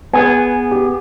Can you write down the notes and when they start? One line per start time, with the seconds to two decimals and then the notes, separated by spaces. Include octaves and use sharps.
0.13 B3 G#4 B4 G#5
0.71 G4